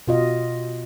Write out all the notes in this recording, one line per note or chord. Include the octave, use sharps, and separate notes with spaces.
B2 F4 D#5